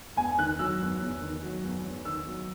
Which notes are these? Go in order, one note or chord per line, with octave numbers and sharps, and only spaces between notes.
E2 G#5
D#3 F#6
F#3 E6
E2
E2
D#3
F#3
E2
E2
D#3 E6
F#3